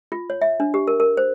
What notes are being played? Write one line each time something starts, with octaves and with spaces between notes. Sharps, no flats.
F4
C#5
E5
D4
G4
A#4
A#4
C5